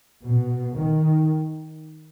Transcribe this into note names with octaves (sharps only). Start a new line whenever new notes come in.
B2
D#3